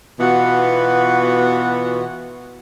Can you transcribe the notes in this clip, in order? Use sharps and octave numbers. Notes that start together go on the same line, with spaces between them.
B2 E3 B3 F4 F#4